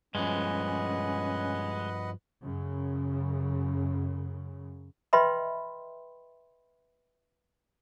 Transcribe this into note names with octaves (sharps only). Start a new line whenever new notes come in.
G2 F3 G#3 C#4 B4 D#5 F#5
F#2 C#3
B4 D#5 E5 G5 B5 C6